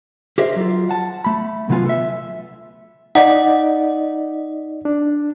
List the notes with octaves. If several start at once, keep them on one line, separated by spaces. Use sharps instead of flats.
G4 G#4 A#4 C5 D#5 E5
F#3 F4
F#5 A5
A3 B5
C2 D3 F#3 B3 F4 G#5
A4 E5
D#4 D5 D#5 F#5
D4